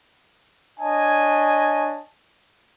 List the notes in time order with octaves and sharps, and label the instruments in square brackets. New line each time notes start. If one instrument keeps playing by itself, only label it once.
[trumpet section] D4 C#5 D#5 G#5 A5